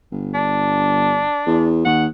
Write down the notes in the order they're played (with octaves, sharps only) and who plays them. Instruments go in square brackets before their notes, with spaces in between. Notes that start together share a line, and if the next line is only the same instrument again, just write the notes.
[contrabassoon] G1
[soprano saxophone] D4
[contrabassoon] E2
[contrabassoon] D#2 [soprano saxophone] F#5